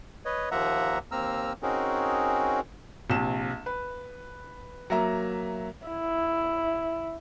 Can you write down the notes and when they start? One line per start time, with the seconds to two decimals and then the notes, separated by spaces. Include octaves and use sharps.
0.25 B4 C#5 D#5
0.51 D#2 F3 A#3 E5 F#5 A#5
1.12 D#2 A#3 C4 A#5 E6 F6
1.63 C4 C#4 D#4 F#4 G#4 A#4
3.10 A#1 C3 E7
3.66 B4
4.90 F#3 A#3 E5 A#5
5.87 E4